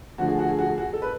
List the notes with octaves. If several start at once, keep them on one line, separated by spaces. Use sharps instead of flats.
D3 F3 A3 F#4
G#4
F#4
G#4
F#4
G#4
F#4
A4
B4